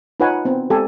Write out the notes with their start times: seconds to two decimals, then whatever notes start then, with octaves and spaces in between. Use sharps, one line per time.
0.20 D#4 F4 B4 C#5 F#5 G#5
0.45 B3 C4
0.70 G#3 C4 G4 A4 G#5